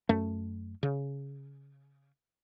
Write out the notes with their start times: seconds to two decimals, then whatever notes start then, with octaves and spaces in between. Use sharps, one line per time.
0.09 F#2 A3
0.83 C#3